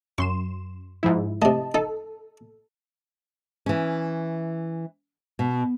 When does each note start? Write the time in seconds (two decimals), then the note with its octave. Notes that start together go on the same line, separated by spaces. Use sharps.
0.18 F#2 C6 C#6 E7
1.03 G#2 F3 E4
1.42 C3 A3 D#5 A5
1.74 D#4 A4
3.66 E3 C#4
5.39 B2